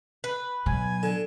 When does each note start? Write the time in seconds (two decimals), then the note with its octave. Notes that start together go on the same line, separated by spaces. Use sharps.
0.24 B4
0.66 B2 F#3 G#5
1.03 D3